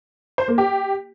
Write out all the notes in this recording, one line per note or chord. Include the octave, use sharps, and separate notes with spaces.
C5
A#3
G4